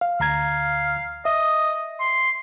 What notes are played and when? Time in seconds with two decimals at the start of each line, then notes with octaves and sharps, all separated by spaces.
0.01 F5
0.20 D2 F5 A#5 G#6
1.25 D#5 E5
2.00 C6